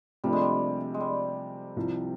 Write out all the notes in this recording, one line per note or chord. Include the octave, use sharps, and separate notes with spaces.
C3 F3 G3 A3 D4
G#3
G3
G#3
G3
C2 C3 F3